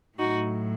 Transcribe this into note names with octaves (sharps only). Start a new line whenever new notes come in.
A2 F#3 D#4 F#4